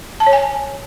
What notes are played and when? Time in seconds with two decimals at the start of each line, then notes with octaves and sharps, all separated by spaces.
0.20 A5
0.27 C#5
0.33 G#5